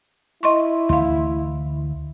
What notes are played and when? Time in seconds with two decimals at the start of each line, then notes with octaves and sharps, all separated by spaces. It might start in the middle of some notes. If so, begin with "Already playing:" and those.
0.43 E4 D#5 C6 C#6
0.89 D2 E3 F5 C6